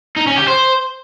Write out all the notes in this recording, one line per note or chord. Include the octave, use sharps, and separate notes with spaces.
D#4
C#4
G4
C5